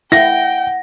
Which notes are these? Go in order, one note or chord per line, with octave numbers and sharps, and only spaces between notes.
E4 F#5 G5 A#6